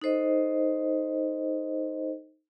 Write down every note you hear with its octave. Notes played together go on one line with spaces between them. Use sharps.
D#4 A4 C5 D#5